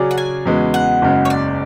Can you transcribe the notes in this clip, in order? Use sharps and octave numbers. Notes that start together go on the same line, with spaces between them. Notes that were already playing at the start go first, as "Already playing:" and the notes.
Already playing: C#3 F#3 C#4 G#4 D5
F#5
G#5
E2 C#3 G#3 B3 F#4
F#5
F#1 F#2 C#3 G#3
C#5
D5